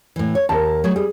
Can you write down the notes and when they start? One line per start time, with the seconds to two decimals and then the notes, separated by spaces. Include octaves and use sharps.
0.16 A2 E3
0.35 C#5
0.49 D#2 A#4 A5
0.84 F#3 A3 G#4
0.96 G3 G#4